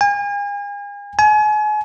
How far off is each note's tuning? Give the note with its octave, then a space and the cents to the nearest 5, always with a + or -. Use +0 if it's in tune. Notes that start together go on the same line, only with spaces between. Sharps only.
G#5 -40
G#5 +35